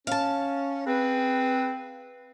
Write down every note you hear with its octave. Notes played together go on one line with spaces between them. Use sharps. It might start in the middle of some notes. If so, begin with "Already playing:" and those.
C#4 F5 A5
C4 G#4 B4